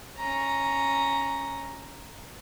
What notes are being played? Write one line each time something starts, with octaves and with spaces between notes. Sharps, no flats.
C#4 A#5